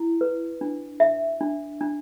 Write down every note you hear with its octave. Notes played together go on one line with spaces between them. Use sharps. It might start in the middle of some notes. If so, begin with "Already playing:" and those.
Already playing: E4
B4
D4
E5
D4
D4